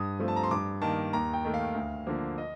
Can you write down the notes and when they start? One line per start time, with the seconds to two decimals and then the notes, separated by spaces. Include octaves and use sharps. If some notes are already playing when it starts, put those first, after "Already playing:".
Already playing: G2 D#6
0.19 F3 A3 C4
0.28 A5
0.36 A#5
0.44 C6
0.51 G2 D6
0.82 D#3 A#3 A5
1.13 D#2 A#5
1.33 G5
1.45 D#3 A3
1.54 F5
1.74 D2
2.07 D3 F3 A#3
2.38 D#5